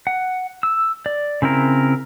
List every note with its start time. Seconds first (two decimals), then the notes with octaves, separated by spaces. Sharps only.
0.07 F#5
0.63 E6
1.06 D5
1.42 C#3 C4 E4 A#4